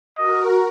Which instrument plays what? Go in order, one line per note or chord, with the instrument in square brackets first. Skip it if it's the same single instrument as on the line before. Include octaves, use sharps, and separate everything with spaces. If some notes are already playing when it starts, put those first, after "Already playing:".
[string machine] F#4 A#4 [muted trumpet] D#5